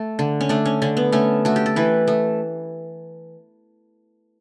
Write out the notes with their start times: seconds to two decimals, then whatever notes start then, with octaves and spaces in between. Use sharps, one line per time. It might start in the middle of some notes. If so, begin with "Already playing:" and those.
Already playing: A3
0.19 D3
0.41 C#4
0.49 A3 D4
0.66 C#4
0.82 D3 C#4
0.97 B3
1.12 A3 C#4
1.45 A3 F#4
1.56 G4
1.66 A4
1.76 E3 B4
2.07 A3